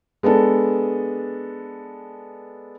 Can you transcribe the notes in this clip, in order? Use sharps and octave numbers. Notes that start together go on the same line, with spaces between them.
G#3 B3 D4 A4